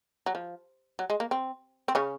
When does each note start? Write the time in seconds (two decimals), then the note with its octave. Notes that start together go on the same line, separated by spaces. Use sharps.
0.26 F#3
0.35 F3
0.99 F#3
1.10 G#3
1.20 A#3
1.31 C4
1.88 C4
1.95 C#3 C#4